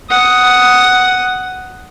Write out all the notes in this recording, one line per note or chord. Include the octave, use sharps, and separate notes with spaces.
F#5 D#6